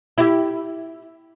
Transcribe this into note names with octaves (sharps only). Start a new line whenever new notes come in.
E4 G4